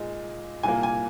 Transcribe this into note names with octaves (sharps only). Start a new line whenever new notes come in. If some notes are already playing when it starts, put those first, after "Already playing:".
Already playing: A#2 G#3 D#4
C2 A#2 A#3 G#5
G#5